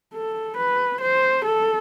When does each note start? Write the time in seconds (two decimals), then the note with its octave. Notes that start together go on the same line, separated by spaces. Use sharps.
0.14 A4
0.57 B4
1.01 C5
1.45 A4